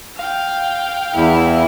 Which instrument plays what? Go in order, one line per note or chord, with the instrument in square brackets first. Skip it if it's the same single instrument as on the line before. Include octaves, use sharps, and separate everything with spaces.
[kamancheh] F5 G5
[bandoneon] E2 [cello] E4